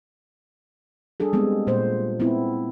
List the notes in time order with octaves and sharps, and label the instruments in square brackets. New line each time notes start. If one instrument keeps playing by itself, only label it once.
[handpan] G3 D4 G#4 A4
G3 G#3 B3 C4
A#2 A#3 C5
B3 C4 E4